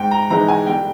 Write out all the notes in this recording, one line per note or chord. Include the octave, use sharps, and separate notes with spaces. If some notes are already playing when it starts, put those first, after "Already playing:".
Already playing: G#2 G5
A#5
E3 G#3 D#4 A#5
G#5
G1 G5